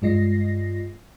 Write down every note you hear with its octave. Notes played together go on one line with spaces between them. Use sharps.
G2 G#3 F4 D#5 A#6 C7